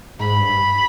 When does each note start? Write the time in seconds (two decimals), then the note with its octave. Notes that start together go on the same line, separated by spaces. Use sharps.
0.20 G#2 B5
0.39 G2